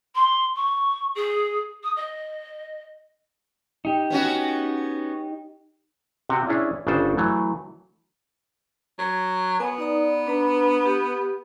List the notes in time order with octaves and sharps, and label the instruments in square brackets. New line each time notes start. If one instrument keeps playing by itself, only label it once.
[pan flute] C6
C#6
G#4
D#6
D#5
[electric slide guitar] D#4 G4
[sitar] B3 C#4 F#4
[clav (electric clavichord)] C3 F#4 F#5 G5
C#4 D4 E4 G#4 C#5
G1 C#3 D4 A4 C5
E3 F#3 A3
[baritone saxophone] F#3
[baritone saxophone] B3 [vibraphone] G#5
[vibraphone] D#4 D5 A#5
D4 B4 A#5
G4